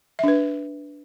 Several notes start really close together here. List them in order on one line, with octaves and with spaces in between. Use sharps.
E5 D4 B4